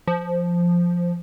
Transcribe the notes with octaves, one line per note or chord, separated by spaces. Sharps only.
F3